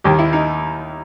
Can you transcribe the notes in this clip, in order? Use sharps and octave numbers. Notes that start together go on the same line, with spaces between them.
D#2 D#3 G4
E4
D#4